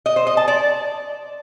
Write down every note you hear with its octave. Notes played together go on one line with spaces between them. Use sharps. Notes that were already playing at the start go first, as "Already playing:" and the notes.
D#5
C5
D#5
A5
D5